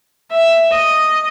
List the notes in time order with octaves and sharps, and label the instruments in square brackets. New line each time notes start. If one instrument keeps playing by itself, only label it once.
[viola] E5
D#5